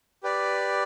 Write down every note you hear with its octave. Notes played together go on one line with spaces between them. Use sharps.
G4 B4 D5